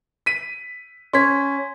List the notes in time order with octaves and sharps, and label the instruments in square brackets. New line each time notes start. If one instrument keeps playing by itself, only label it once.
[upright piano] B6 D#7
[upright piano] C#4 B6 [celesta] C6 G#6